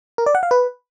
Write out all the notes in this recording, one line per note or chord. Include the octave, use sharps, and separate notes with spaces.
A#4
D5
F#5
F5
B4